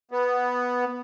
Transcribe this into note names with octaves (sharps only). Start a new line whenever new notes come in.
B3